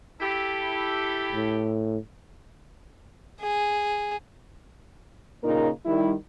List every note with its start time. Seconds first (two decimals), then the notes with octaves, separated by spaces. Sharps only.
0.21 E4 G4 A4
1.32 A2
3.41 G#4
5.43 A#2 C#3 A#3 D#4 A#4
5.86 D#3 G3 E4